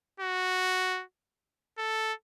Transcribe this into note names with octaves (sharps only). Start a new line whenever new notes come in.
F#4
A4